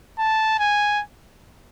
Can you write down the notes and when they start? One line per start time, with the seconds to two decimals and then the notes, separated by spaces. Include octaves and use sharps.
0.19 A5
0.59 G#5